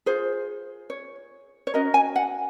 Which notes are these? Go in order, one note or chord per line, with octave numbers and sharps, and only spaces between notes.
F4 G#4 C5
C#5
C#5
C#4 F#4 A#4 D#5
G#5
F#5